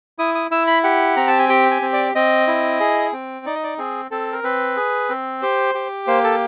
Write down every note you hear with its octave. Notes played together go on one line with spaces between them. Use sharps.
E4 D#6
D#6
E4 E6
B5
G4 F#5
C4 A#5
A5
G#5
G4 G5
G#5
C4
D5
C4 D#5
E4
G#4
C4
D#4 D5
D#5
D5
C4 G#4
C4 A4
A#4
C4 B4
G#4
C4
G4 C5
G4
A#3 C5
A4